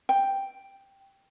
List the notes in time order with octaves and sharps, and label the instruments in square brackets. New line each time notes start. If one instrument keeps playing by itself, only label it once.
[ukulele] G5